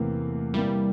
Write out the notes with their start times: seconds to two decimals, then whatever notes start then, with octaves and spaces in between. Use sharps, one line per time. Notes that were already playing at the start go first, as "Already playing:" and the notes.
Already playing: E2 C3 E3 A3 A#3
0.54 C3 E3 G3 A#3 E4